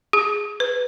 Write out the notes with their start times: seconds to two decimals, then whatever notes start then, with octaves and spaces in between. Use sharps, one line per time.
0.13 G#4
0.60 B4